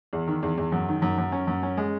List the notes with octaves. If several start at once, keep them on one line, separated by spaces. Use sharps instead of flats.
E2
D#3
E2
E2
F#2
D#3
F#2
F#2
C#4
F#2
C#4
G#3